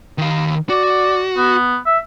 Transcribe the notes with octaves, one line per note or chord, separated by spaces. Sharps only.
D#3 F5
F#4 D5
B3
E5